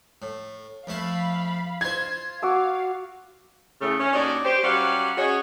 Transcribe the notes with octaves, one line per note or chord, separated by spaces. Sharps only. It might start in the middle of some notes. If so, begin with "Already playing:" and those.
A2
F2 A3 E4 F5 B5
F4 C5 G#6
F#4 F5 D6 E6
A2 C#3 A3
C#4
D#2 C#4 D4 F#4 D5 D#5
G4 C5
F#3 G3 C#4 F5 F#5
C#4 F#4 G#4 C#5 D#5